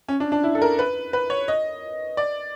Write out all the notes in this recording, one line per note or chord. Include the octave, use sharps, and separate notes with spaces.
C#4
D4
D4
E4
A4
A#4
B4
B4
C#5
D#5
D5